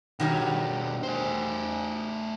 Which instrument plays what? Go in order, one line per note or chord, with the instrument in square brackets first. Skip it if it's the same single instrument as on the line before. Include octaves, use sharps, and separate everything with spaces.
[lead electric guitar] B2 D4 [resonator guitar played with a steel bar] D#3 F#3 G3
[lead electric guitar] A3 C5